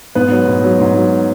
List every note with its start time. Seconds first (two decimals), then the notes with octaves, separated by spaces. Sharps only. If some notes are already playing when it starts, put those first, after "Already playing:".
0.15 G#2 B3 B4
0.31 F#3
0.48 G#2
0.64 F#3
0.80 G#2
0.96 F#3